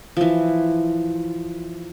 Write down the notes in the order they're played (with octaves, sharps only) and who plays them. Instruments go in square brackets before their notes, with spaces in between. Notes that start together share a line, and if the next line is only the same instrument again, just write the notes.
[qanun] E3 F3